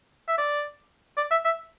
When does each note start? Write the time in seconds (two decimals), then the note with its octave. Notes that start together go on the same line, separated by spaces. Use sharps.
0.28 E5
0.38 D5
1.17 D5
1.31 E5
1.45 E5